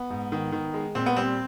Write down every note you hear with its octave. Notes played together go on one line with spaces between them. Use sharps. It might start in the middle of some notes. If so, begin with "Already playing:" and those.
Already playing: B3
G#2
D#3
D#3
G#3
A#2 C4
B3
G3 C4